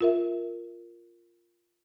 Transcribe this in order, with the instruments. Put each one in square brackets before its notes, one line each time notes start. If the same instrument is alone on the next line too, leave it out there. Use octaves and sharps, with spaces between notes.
[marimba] F4 A#4 E5